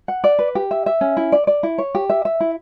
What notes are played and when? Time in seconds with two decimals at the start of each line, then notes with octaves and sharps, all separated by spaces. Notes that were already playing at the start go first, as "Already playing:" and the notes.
0.08 F#5
0.24 D5
0.39 B4
0.55 G4
0.71 E5
0.86 E5
1.01 C#4
1.17 E4
1.32 D5
1.47 D5
1.63 E4
1.78 C#5
1.95 G4
2.10 E5
2.25 E5
2.40 E4